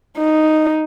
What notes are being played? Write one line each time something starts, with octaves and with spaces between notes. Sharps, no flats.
D#4